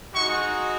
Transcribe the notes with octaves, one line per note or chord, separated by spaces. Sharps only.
G#3 D#4 F#4 C#6